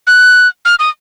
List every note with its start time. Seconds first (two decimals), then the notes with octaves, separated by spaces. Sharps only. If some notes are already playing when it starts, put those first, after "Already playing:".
0.07 F#6
0.65 F6
0.79 D#6